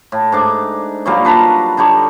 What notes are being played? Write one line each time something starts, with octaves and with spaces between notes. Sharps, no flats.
A2
G#2 D4 D6
A#2 F#3 G3 F5
D4 B4 A5 A#5
D3 G3 D#4 C#5